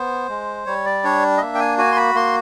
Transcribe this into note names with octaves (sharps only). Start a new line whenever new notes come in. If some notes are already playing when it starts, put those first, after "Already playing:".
Already playing: B3 C5
G#3
G3 C#5
D5
D4 C#5
D#5
A#3 E5
G5
G#5
F#4 G#5
C6
B5
A#3 C6